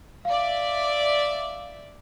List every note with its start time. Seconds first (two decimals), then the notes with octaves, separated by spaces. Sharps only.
0.25 D5 E5 F5